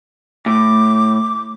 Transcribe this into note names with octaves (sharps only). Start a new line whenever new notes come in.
A2 D6